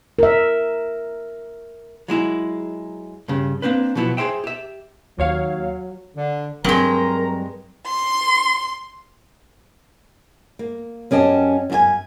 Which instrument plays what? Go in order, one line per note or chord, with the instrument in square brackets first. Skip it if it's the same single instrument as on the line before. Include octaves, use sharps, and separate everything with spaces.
[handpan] A#4 E5
[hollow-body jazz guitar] F#3 G#3 E4
G2 C#3
A#3 C4 D4 B4
B2 F3 F#3 B3 E4
G#4 A4 C5 E5 G5
G4 E5
[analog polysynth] D#2 C#5 F5 [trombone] F#3
[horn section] D3
[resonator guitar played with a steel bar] G2 G#3 [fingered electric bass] F#3 C4 [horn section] A#4 A#5
[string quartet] C6
[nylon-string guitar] A#3
F#2 C#4 G4 D#5 A5
F#2 F#4 G#5